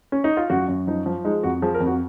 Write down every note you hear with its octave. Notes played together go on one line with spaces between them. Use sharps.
C#4
D#4
F4
F#2 F#4
F#2
F3 D#4
F3
G#3 D#4
F2 F#4
F3 G#4
A#4
F2
F#4